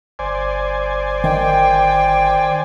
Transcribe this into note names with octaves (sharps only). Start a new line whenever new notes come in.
G1 C5 D5 G#5
D#3 G5